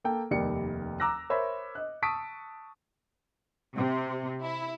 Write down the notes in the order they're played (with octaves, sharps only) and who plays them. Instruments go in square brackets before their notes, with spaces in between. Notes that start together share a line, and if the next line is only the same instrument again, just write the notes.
[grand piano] A#3 A4 G5
F1 D#2 G3 A#4 D5 C#7
A#5 D6 E6 F#6 A#6
A#4 C5 C#5 E5 B5
D#5 F#6
A5 C#6 D#6 E6 B6 D7
[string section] C3
E4